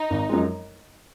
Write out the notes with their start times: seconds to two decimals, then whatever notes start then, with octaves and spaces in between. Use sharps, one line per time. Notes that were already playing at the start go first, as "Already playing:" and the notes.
Already playing: D#4
0.10 G#1
0.29 F#2 F3 G#3